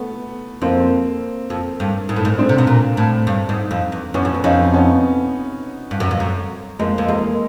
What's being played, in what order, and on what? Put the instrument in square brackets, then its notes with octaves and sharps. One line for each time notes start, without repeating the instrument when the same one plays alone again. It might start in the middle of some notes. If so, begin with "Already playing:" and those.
Already playing: [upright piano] A3 B3
[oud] F2 [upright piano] A#3 C4
[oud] F2
G2
G#2
A2
G#2
[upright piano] C4 D4
[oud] C3
B2
A#2
A2
G2
G#2
F2
E2
[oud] F#2 [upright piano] B3 C#4
[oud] F2
E2
[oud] F2 [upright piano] C#4 D#4
[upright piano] B3 C#4
[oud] G2
F#2
F2
F#2
[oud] F2 [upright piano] G#3 A#3
[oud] F2
[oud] E2 [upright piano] G#3 A#3